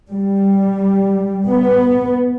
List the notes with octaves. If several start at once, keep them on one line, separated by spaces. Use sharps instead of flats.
G3
B3